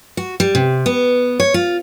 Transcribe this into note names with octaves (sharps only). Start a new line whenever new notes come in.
F#4
G3
C3
B3
C#5
F4